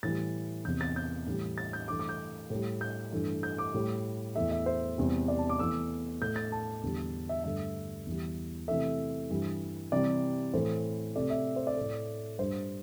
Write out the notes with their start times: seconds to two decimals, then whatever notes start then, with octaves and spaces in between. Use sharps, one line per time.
0.03 A2 E3 G3 A6
0.65 E2 C3 E3 G6
0.81 A6
0.96 G6
1.27 A2 E3 G3
1.58 A6
1.73 G6
1.88 G2 E3 A3 D6
1.99 D6
2.09 G6
2.50 A2
2.55 G3
2.81 G6
3.12 G2 E3 A3
3.43 G6
3.58 D6
3.74 A2 G3
4.36 E2 E3 A3 E5
4.51 E5
4.66 C5
4.98 E2 C3 G3
5.28 D5
5.39 A5
5.49 D6
5.59 E2 E3 A3 E6
6.21 A2 A3 G6
6.36 A6
6.52 A5
6.83 E2 D3 G3
7.29 E5
7.44 G2 D3 A3 E5
8.06 E2 E3 G3
8.68 C3 E3 A3 E5
9.30 G2 E3 G3
9.92 C3 E3 G3 D5
10.54 A2 E3 A3 C5
11.16 C3 A3 D5
11.30 E5
11.56 C5
11.67 D5
11.77 A2 A3
12.39 G2 G3 C5